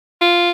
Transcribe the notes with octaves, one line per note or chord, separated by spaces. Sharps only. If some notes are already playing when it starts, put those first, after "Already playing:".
F4